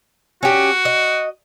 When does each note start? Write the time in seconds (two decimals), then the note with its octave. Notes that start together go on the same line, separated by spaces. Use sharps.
0.43 C#4 F#4 G4
0.85 D#5